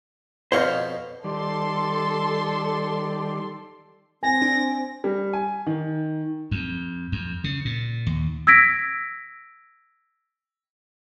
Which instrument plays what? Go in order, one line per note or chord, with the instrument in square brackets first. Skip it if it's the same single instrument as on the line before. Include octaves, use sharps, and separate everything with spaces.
[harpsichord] F2 B2 A#5 [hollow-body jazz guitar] C5 C#5 F5
[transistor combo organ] D#3 G3 D5 [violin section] A4 C6
[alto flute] C4 [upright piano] G#5 [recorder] A#6
[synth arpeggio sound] D4
[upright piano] G3
G#5
D#3
[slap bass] F2
F2
C#3
A#2
D#2
[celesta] E6 G#6 A#6 B6 D7